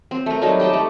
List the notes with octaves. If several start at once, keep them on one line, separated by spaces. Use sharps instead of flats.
C4
A3 A#4
F#3 G3 A3 D#4
G4 D#5 G5 A5
A3